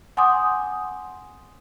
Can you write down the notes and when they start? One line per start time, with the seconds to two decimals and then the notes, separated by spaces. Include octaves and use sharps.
0.17 F#5 G#5 C6 D6 D#6 G6